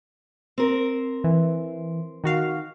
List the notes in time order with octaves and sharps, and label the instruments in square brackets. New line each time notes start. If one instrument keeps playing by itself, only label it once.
[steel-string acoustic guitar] C4 A#4
[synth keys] E3
D#3 F#4 F5